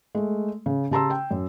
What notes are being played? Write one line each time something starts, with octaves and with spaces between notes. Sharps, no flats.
G#3 A3
C#3
C#3 G4 A5 A#5 C6 E6
G5
F#2